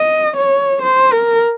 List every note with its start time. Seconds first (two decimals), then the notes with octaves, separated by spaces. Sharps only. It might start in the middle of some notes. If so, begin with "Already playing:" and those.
Already playing: D#5
0.37 C#5
0.82 C5
1.12 A#4